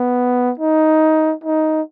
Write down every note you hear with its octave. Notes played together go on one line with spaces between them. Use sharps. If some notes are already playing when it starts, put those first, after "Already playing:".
Already playing: B3
D#4
D#4